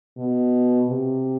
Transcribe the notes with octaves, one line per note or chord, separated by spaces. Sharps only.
B2
C3